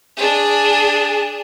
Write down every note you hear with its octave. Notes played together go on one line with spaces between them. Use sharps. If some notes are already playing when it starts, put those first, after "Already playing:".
D4 G#4